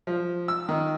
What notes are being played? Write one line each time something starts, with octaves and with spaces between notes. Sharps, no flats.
F3
E6
D#3